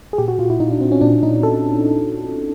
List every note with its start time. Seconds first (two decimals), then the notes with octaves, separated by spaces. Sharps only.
0.13 G#4
0.18 A#2 G4
0.28 F#4
0.39 A#2 F4
0.50 E4
0.60 A#2 D#4
0.71 D4
0.81 A#2 C4
0.92 C#4
1.01 A#2 D4
1.23 A#2 D#4
1.43 A#2 A4